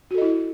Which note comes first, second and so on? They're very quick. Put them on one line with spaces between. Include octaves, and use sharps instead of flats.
F#4 A4 D#5 E4